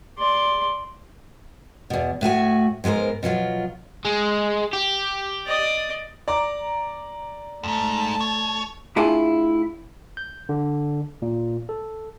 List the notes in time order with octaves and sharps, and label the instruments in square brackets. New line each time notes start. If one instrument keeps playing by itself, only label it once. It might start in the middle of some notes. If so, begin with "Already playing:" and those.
[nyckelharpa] D5 C6
[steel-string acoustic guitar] E2 B2
A2 A3 F#4 G#5
G#2 G#3 B3 A#4 C5
B2 F3 F#3 F4
[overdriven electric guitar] G#3
G4
[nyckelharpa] D5 D#5
[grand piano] D5 A#5 D6
[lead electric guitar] F2 G#2 [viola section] A3 A5
[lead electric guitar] C#5
[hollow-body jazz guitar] A2 D4 E4 F4 G#4 G#5
[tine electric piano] G6
D3
A#2
A4